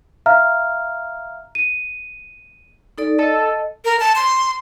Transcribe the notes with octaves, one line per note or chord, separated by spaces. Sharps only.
E5 F5 A#5 F6
D#7
D#4 A4 D5
A4 D#5
A#4
A5
C6